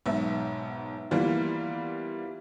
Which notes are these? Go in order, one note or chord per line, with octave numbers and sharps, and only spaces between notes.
B1 G#2 B3 E5
E3 G3 A#3 B3 F4